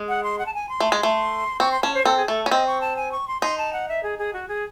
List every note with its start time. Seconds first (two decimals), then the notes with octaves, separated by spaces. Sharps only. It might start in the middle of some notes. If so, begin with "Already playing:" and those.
Already playing: G#3
0.09 F#5
0.23 C6
0.39 F#5
0.46 A5
0.54 G#5
0.69 C6
0.80 A3
0.92 G#3
1.03 A3
1.60 C4 C#6
1.72 C6
1.83 C#4 A5
1.94 C5
2.05 C4 A4
2.17 G#4
2.28 A3 A4
2.46 C#4
2.51 C4 D#5
2.67 C#6
2.81 A5
2.96 G#5
3.12 C#6
3.28 C6
3.42 D#4 C6
3.58 A5
3.73 F#5
3.89 E5
4.03 G#4
4.19 G#4
4.33 F#4
4.48 G#4